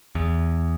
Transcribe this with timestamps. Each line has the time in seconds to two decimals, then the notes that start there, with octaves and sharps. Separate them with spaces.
0.15 E2